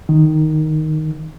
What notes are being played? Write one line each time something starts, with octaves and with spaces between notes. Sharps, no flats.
D#3